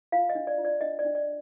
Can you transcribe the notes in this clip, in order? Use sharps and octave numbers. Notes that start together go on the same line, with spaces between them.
F4 F5
D#5
D4
D5
F4
D5
D4 D#5
D5
D4
D5